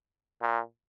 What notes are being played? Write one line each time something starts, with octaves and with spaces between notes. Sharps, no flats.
A#2